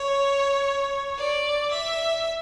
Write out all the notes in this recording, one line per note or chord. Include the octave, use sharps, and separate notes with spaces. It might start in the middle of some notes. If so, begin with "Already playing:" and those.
Already playing: C#5
D5
E5